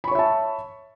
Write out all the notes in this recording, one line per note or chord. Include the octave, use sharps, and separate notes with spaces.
C#5 E5 A5 B5 C#6